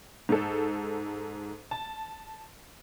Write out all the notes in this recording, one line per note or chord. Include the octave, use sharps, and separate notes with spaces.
G#2 A4
A5